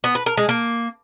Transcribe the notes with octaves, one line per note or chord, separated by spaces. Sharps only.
B3
B4
A#4
G#3
A#3